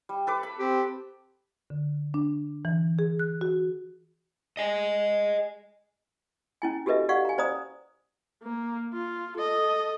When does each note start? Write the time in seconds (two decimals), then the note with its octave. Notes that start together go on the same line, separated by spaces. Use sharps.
0.09 G3
0.27 A4 B4 D6
0.43 B5
0.59 C4 G4
1.70 D3
2.14 D4
2.65 E3
2.99 G#4
3.20 F#6
3.41 F#4
4.57 D#5 G#5
6.62 C#4 E4 G#5
6.86 F#4 G4 A4 B4 D#5 E5
7.09 G4 D5 F5 F#5 C#6
7.25 G#5 A#5
7.38 C#4 C5 D5 A#5 D#6
8.43 A#3
8.93 F4
9.37 A4 D#5